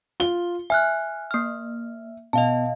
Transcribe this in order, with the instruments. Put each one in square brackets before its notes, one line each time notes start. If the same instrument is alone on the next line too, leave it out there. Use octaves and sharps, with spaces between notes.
[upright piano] F4 G7
[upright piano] E5 [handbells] G#5 F6 F#6
[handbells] A#3 F6
[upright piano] B2 [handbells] D#5 F5 A5